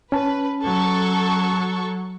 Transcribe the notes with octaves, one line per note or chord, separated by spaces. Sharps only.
C#4 B4 A5
F#3 A4 C#6